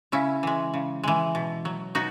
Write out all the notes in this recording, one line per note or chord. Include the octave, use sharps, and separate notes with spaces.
C#3 C#4 E4
E3 G#3
C#3
E3 G#3
B2
F#3
B2 D#4 F#4